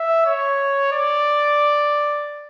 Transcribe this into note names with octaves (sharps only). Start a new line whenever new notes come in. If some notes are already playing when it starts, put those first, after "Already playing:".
Already playing: E5
C#5
D5